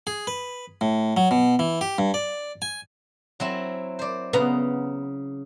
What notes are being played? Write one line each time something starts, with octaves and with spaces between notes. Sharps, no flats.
G#4
B4
A2
F#3
B2
E3
G4
G2
D5
G#5
F#3 C4 E4
C5 D5
C#3 B3 A#5 C6